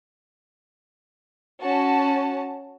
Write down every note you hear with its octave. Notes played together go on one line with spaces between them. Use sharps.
C#4 F#4 A5